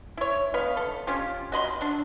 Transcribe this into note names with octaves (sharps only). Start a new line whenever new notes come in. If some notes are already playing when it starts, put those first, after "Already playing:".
E4 C#5
B3 B4 F5
A4
C#4 F4 G4
F#4 D#5 B5 C6
F#3 D4